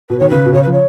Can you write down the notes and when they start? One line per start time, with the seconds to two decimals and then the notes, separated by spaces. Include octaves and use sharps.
0.09 B2 B4
0.19 D#3 C#5
0.29 C#3 B4
0.45 B2
0.53 C#3 C#5
0.63 F3 B4
0.72 C#5